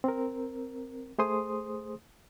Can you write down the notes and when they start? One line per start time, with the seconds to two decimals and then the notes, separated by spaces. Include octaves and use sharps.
0.04 C4 A#4
1.19 A3 G#4 C5 C6 D#6